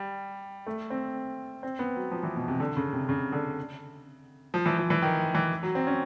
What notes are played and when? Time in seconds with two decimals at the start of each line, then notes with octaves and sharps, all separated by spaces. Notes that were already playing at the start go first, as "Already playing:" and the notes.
Already playing: G3
0.67 A3
0.90 C4
1.63 C4
1.79 B3
1.96 F#3
2.11 F3
2.23 E3
2.36 B2
2.48 C3
2.60 D3
2.77 C#3
2.93 C3
3.09 C#3
3.32 D3
4.54 F3
4.66 E3
4.78 F3
4.90 E3
5.02 D#3
5.35 E3
5.63 F#3
5.75 C4
5.87 C#4